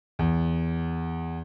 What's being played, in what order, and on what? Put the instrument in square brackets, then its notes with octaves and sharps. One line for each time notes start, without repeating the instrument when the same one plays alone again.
[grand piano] E2